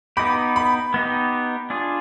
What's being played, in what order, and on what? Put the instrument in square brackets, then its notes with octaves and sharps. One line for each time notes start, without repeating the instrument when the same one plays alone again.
[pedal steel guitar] B3 D#4 G4 [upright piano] B5
[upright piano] B5
[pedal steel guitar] B3 D#4 G4
D4 F4 G#4